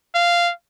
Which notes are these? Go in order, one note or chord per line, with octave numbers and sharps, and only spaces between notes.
F5